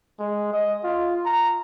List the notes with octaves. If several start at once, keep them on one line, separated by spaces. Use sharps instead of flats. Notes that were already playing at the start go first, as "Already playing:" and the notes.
G#3
D#5
F4
A#5